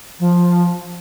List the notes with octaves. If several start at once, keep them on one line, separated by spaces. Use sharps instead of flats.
F3